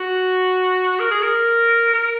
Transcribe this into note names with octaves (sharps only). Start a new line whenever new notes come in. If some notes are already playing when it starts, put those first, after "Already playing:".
Already playing: F#4
A#4
G#4
A#4
A#4